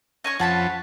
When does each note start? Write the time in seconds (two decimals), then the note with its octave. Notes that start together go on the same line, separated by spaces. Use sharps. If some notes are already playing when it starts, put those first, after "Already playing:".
0.24 C#4 D#5 G#5 C#6
0.40 F2 F3 C#4 F#5 A5 B5